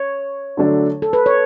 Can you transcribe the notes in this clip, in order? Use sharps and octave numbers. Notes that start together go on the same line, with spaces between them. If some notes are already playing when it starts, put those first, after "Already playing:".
Already playing: C#5
D3 F#3 A3 D4 A4
A4
B4
C#5